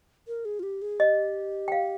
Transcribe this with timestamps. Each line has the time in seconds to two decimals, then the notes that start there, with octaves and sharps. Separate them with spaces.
0.28 A#4
0.45 G#4
0.59 F4
0.63 G4
0.82 G#4
1.00 G4 D#5
1.68 G5
1.72 F5